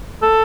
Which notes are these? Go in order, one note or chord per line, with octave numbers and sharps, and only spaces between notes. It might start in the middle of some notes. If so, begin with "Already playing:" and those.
A4